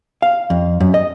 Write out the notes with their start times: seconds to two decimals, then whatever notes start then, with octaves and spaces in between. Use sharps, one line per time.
0.22 F5
0.50 F2
0.80 F#2
0.94 D#5